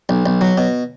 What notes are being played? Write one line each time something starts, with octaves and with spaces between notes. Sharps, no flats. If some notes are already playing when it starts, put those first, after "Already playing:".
B1
B1
F#3
B2